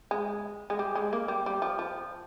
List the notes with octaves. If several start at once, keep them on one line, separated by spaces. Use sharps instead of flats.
G#3
G#3
G3
G#3
A#3
G3
G3
F3
F3